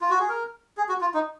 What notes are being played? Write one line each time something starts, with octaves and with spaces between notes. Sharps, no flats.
F4
F#4
G#4
A#4
G#4
F#4
F4
D#4